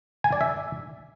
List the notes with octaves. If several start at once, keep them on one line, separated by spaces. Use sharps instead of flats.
G#5
D5
E5